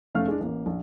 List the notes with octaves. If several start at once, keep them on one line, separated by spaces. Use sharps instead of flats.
F1 A3 C#4 F5 F6
G#3 D4
A1 A#3
A#1